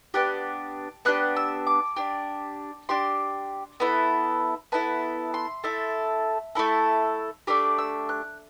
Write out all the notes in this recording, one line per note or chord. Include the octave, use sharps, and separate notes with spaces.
B3 D4 G4 F#6
B3 D4 G4 F#6
E6
D6
D4 G4
D4 G4 C6
B3 E4 A4
B3 E4 A4 A5
C6
A3 E4 A4
A3 E4 A4
A3 D4 G4 D6
E6
F#6